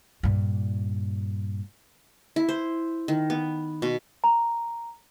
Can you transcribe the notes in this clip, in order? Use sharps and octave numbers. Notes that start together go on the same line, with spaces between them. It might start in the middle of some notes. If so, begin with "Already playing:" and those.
G2 A#2
E4
C5
D#3
B3
B2
A#5